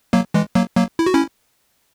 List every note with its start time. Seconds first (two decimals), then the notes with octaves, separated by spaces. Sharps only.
0.13 F#3 A#3
0.34 E3 G#3
0.55 F#3 A#3
0.77 F#3 A#3
0.99 E4
1.06 F#4
1.14 C#4 E4